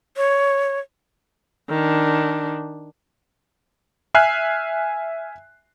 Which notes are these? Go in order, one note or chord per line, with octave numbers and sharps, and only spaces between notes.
C#5
D#3 D4
E5 G#5 F6 F#6 C7